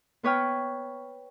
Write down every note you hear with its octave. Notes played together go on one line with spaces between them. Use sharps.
B3 B4 C#5 G5 F6